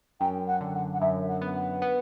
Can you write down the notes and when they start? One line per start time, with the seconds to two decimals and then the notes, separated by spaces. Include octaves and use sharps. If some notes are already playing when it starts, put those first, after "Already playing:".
0.20 F#2 G5
0.47 F#5
0.61 D3
0.74 F#5
0.93 F#5
1.01 F#2 E5
1.28 F#5
1.42 B3
1.55 F#5
1.82 B3